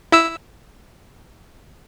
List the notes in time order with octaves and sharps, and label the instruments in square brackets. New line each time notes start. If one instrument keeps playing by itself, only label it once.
[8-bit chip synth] E4 E5 E6